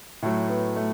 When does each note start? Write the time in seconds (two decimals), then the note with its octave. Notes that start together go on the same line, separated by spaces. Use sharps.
0.22 A2 F#3 A3
0.49 B3
0.76 A3